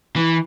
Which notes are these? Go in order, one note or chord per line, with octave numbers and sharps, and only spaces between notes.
E3